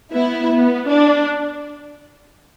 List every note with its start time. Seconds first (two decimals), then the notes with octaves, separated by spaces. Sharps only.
0.12 B3 E4
0.51 B3
0.89 D4